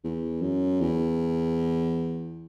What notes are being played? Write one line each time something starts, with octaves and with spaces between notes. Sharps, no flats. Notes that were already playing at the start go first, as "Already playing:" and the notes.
E2
F#2
E2